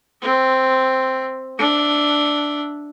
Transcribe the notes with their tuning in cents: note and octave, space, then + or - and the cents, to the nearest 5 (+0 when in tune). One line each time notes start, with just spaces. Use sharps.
C4 +0 E5 +0
D4 +0 E5 +0